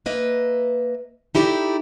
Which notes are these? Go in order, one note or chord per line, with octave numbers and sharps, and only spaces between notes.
A#3 B4 D#5 E5
D#4 E4 G4 A4 C5 D5